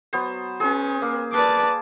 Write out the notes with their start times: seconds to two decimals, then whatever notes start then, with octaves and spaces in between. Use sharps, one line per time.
0.13 F#3 B3 C5
0.60 C#4 G#4 B4
1.02 A#3
1.33 B4 D5 A5 D6